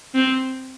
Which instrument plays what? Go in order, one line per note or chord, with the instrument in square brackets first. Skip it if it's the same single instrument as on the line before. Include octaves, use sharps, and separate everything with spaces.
[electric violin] C4